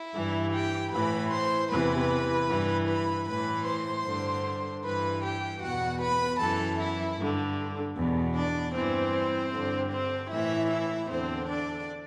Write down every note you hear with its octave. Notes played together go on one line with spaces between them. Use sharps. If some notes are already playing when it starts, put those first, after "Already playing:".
Already playing: E4 E5
G2 E3
G4 G5
A2 E3 B4 B5
C5 C6
E2 C3 E3 B4 B5
G2 E3
B4 B5
A2 E3 B4 B5
C5 C6
G2 D3
G2 E3 B4 B5
G4 G5
E2 B2 F#4 F#5
B4 B5
F#2 E3 A4 A5
E4 E5
G2 D3
E2 B2
D4 D5
G2 E3 C4 C5
G2 D3
C4 C5
A2 E3 E4 E5
E4 E5
E2 D3 C4 C5
D4 D5